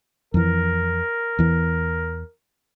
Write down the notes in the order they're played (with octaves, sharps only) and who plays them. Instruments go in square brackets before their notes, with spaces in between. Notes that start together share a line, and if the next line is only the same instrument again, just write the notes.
[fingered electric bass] F2 E3 [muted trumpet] A#4
[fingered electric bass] E2 E3